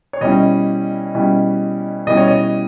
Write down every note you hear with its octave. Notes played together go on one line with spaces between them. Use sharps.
C#5
B2 G3 C#4 E4 D#5
B2 G3 C#4 E4
B2 G3 C#4 E4 D#5
C#5
D#5